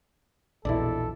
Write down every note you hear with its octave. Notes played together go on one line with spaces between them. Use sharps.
A#1 E2 B2 E4 A4 D5